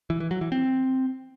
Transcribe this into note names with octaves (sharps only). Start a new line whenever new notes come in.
E3
E3
F#3
E3
C4